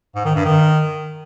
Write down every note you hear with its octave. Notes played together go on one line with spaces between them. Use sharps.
G#2
D#3
G2
D#3